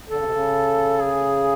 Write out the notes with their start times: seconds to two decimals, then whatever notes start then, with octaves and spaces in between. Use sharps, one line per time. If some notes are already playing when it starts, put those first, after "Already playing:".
0.10 D3 A4
0.17 C#3
0.24 C3
0.31 C#3
1.01 G#4